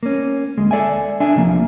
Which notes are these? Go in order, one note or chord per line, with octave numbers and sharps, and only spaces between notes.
A#3 C#4
D2 G#3
A4 D5 E5 G#5
D4 E5 G#5
C2 F3 A#3